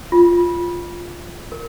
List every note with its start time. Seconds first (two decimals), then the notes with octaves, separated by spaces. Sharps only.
0.12 F4
1.52 A#4